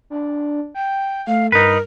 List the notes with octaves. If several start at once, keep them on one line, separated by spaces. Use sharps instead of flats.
D4
G5
A3 F5
G2 D#4 A#4 B4